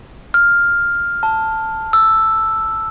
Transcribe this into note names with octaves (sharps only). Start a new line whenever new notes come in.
F6
A5
E6